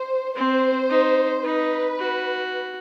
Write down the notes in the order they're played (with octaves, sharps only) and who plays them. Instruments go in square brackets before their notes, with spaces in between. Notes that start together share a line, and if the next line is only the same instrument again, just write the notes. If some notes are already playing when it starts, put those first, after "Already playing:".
Already playing: [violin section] C5
[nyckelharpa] C4 [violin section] C5
[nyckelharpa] D#4
[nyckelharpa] D#4 [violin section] B4
[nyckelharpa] F#4